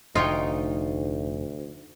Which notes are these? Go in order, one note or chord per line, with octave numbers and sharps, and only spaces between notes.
F1 D2 D#4 F4 C#5 G5